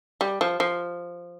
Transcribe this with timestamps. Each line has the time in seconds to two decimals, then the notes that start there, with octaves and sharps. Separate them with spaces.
0.21 G3
0.41 F3
0.60 F3